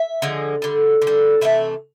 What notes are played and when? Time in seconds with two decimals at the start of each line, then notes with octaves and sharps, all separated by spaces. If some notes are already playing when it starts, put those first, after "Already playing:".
Already playing: E5
0.22 D3 F3 G#3
0.62 D3 G3
1.02 D3
1.07 G3
1.41 C3 E3 A3 E5